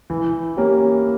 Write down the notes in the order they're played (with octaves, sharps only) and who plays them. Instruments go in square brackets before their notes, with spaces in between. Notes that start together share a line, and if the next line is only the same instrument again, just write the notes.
[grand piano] E3
A#3 C#4 G4